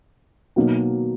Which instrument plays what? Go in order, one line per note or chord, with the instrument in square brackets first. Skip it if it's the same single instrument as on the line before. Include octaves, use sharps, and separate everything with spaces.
[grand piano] B2 F#3 A#3 D#4